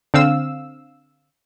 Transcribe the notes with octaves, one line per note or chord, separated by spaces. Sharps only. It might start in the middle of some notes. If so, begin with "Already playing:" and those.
D3 C4 F5 E6